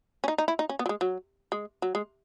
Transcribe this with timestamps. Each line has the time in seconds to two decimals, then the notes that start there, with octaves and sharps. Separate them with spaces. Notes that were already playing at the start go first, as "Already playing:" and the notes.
0.24 C#4
0.28 D#4
0.38 D#4
0.48 E4
0.59 D#4
0.69 C#4
0.79 B3
0.86 F#3
0.89 G#3
1.01 F#3
1.52 G#3
1.82 F#3
1.95 G#3